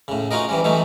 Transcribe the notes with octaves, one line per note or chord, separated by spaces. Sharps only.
A2 C#3
C#4 D#4 F4 F#4 A#4 D#5
E3 G3 C#4
E3 F#3 A3 C#4 D#4